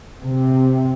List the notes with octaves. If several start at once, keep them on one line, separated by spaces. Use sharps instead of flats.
C3